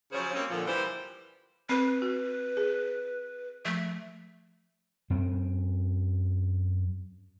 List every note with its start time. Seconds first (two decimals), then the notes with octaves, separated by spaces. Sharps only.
0.13 C#3 F3 F#3 C#4 G#4 C5
0.33 G3 A#3 C4 C#4
0.50 A#2 D3 F3
0.67 E3 G3 A#3 G4 C5
1.69 C4 B4
2.02 F#4
2.57 G#4
3.65 F3 A3
5.10 F#2 C4